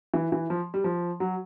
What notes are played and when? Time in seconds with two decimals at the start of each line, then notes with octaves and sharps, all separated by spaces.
0.14 E3
0.32 E3
0.50 F3
0.74 G3
0.84 F3
1.20 F#3